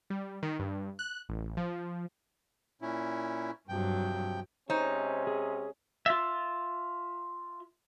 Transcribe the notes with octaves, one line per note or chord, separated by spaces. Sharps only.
G3
D#3
G2
F#6
A1
F3
A#2 C#4 E4
G2 C3 F3 F#3 G5
C3 G#3 C#4 D#4 C5 C#5
G#4
F4 E5